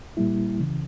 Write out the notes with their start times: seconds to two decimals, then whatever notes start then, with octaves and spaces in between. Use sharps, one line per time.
0.17 A#2 G3 A#3 E4
0.60 C#2 C#3 E3